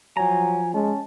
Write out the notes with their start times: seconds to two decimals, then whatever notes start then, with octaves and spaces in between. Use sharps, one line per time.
0.17 F3 F#3 G#5 A#5
0.74 G#3 C#4 A5